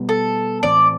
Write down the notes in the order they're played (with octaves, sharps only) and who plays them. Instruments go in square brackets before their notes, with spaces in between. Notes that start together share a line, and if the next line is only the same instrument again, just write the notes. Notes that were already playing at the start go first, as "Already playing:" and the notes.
Already playing: [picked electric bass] B2 G3 B3
[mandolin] A4
[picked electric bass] A2 E3 A3 C4 [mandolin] D5